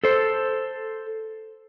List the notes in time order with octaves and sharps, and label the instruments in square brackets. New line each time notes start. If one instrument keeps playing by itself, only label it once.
[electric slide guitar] A4 C5